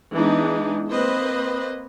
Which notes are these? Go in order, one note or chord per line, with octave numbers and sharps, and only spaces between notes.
E3 G#3 B3 D4 D#4
A#3 C4 B4 C5 D#5